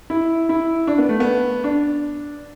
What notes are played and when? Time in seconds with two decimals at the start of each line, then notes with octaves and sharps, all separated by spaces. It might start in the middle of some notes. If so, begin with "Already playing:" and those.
0.10 E4
0.49 E4
0.87 D4
0.98 B3
1.09 A3
1.20 B3
1.64 D4